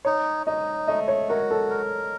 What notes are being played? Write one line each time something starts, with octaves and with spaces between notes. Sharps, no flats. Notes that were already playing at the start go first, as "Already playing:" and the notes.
D#4 C#5
D#4 D#5
A3 D#5
C#5
F#4 A#4
A4
A#4